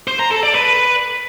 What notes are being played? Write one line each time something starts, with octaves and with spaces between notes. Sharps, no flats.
C5
A#5
A4
D5
B4